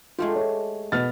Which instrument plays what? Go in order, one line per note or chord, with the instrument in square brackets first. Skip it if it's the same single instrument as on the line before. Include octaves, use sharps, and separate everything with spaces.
[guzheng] G#3 A3 G4 [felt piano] F4
[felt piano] C#5
[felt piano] B2 [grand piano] B3 F6 A6